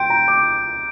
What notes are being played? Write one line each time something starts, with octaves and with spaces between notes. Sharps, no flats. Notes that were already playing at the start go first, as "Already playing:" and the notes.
Already playing: G5 C6 G6 D7
A#5
D6